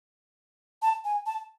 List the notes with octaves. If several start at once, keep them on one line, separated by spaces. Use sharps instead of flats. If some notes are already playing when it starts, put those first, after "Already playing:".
A5
G#5
A5